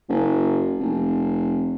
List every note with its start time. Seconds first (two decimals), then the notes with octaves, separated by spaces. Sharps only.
0.09 F#1
0.80 F1